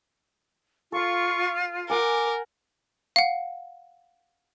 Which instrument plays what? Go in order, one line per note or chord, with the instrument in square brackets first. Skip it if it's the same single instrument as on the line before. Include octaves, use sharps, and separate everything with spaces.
[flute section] F4 [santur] A4 F5 [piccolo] C#6
[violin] A#4 [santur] F#5 G#5 [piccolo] D6
[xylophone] F5 F#5